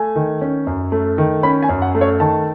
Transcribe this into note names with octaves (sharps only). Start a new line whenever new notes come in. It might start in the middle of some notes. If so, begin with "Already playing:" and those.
Already playing: A3 G#5
D#3
C#4
F#2
A3
D#3
C#4 B5
G#5
F#2
F#5
A3
C#5
D#3 A5